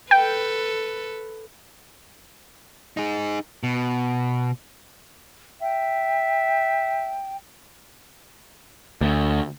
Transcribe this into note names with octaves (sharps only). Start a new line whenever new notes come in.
A4 B4 G5
D#4 G#4
B2
E5 G5
D2